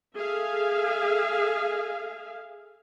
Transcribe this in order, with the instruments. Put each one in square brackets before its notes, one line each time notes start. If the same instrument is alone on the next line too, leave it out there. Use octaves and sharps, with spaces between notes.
[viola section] G#4 A4 E5 F5